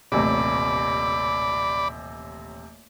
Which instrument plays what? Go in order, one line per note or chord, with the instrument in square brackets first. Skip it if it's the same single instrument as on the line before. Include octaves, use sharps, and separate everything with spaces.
[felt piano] D#1 A1 C3 [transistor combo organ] D5 B5